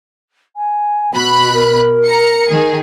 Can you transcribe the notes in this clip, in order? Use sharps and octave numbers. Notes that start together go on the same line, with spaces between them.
G#5
B2 F#4 B5 F#6
A#4
A#5 C#7
D#3 G#4